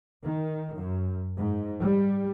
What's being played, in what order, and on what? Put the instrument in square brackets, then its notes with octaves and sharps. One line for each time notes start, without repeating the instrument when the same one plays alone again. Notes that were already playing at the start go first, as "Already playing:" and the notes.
[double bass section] D#3
F#2
G#2
G3